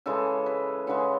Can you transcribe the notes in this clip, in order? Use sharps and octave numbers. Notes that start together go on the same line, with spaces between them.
C#3 E3 G#3 A4
B4
C#3 E3 G#3 F#5